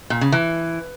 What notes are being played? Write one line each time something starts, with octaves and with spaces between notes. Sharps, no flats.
A#2
C#3
E3